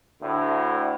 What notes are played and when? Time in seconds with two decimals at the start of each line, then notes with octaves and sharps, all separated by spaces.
0.21 D2 A2 D3